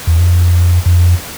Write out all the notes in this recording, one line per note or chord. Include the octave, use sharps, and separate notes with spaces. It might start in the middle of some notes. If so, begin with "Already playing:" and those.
E2
F2
F2